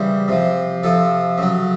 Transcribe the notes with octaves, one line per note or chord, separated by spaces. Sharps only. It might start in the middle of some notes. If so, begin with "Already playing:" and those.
Already playing: C#3 E3 G3 C5
C3 F3
C3 F3 A4
C#3 F#3